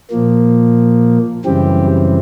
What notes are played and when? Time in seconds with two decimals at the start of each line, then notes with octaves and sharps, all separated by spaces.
0.11 A#2 F3 A#3
1.45 F#2 C#3 E3 G3 C4 G4